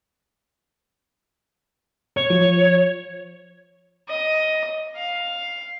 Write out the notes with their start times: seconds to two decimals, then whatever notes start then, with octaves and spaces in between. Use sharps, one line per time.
2.17 C#5
2.30 F3
4.09 D#5
4.96 F5